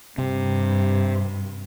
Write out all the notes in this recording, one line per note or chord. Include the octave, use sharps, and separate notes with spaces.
G2 C3